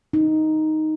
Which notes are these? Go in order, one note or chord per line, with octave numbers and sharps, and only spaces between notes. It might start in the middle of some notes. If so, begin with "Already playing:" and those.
D#4